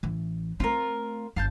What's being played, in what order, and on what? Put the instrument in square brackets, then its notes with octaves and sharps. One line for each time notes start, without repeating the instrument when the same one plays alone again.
[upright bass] A1 E3
[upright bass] A3 C4 [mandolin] F4 A#4
[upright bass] G1 G2 [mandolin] F5 A5 G6